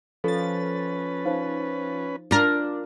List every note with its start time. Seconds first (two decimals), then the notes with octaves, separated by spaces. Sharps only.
0.24 F3 C#4 A4 B4 A6
1.25 D#4 C5 F5
2.31 D4 F4 A#4